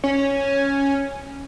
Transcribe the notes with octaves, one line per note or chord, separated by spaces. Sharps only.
C#4